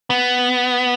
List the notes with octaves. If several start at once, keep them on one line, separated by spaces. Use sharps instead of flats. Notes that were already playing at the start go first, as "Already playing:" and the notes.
B3